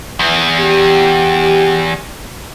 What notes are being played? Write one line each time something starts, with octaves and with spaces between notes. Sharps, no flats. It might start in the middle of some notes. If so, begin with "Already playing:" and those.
E2 E3
G4